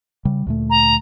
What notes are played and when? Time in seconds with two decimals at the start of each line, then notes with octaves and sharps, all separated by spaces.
0.25 C#3 G3
0.47 D2 A#2 A3
0.70 A#5